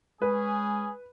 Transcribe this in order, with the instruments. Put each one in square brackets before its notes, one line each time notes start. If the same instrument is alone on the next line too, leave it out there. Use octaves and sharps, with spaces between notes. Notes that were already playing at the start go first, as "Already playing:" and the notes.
[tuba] G#3 [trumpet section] C#4 G#4 [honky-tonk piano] B4